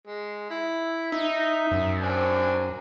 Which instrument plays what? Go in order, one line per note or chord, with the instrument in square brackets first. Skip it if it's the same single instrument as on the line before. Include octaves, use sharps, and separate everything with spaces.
[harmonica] G#3
E4
[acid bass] D#4 [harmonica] E5
[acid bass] F#2
[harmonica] C4 D4 G#5